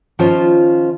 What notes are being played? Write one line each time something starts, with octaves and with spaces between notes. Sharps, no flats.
D#3 F3 C#4 F4 C5